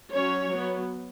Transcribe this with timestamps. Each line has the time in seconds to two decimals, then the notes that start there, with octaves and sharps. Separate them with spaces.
0.12 F#3 C#4 C#5
0.49 F#3 B3